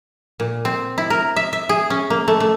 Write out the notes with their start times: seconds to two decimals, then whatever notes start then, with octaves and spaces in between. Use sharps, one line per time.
0.40 A#2
0.65 C4
0.98 E4
1.10 A#4
1.36 E5
1.53 E5
1.69 G#4
1.90 C#4
2.10 A#3
2.28 A3
2.40 A3